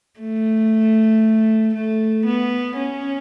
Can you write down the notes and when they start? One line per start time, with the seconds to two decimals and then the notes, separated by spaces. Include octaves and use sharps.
0.20 A3
1.74 A3
2.25 B3
2.77 C#4